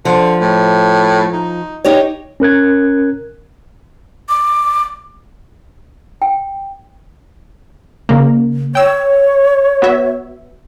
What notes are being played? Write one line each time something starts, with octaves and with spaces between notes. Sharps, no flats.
D3 F3
A2
D#4
D#4 G4 C#5
C#4 A#4 F#6 G#6
D6
G5
C#3 A#3
C#5 G5 E6
B3 F#4 E5